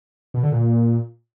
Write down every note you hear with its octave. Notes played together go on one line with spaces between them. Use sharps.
B2
D3
A#2